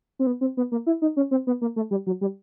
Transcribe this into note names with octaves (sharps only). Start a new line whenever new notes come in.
C4
B3
C4
B3
A#3
E4
D#4
C#4
C4
B3
A#3
A3
G3
F#3
G3